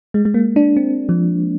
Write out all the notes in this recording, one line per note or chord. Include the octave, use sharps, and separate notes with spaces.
G#3
G#3
A#3
D4
C4
F3